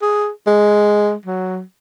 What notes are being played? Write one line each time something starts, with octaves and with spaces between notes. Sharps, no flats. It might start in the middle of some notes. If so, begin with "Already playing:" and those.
G#4
G#3
F#3